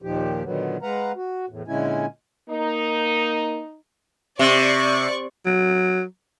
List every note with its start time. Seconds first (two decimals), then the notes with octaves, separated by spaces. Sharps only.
0.02 D#2 A#2 D#3 F3 G4
0.44 A#2 D3 D#3 F#3 B3
0.82 G#3 B4 F5 F#5 A#5
1.16 F#4
1.49 E2 A2
1.68 A#2 D3 G#3 C#4 E4 G#5
2.49 A#3 D#4
4.39 C3 D5 C#6
5.46 F#3